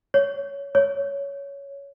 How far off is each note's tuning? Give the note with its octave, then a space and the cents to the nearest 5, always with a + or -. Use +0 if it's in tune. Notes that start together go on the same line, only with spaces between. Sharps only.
C#5 +15
C#5 +10